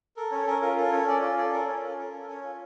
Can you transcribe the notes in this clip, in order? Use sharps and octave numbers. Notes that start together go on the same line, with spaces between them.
A4 A#4
C#4 C#5
C#4 A#4
F4 A#4
A4 A#4
C#4 C#5
C#4 D5
F4 D5
A4 D5
C#4 A#4
C#4 C#5
F4 A4
A4 A#4
C#4
C#4 C#5
F4